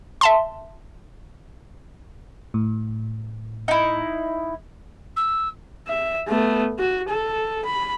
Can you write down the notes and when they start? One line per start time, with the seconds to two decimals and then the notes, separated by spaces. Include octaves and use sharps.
0.21 E5 A5 C6
2.54 A2
3.68 D#4 E4
5.16 E6
5.87 E5
6.28 A3 B3
6.79 F#4
7.09 A4
7.65 B5